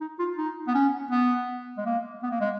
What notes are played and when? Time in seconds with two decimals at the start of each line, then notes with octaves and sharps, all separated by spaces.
0.01 D#4
0.19 F4
0.37 D#4
0.67 B3
0.75 C#4
1.11 B3
1.77 G#3
1.86 A#3
2.23 B3
2.31 A#3
2.40 G#3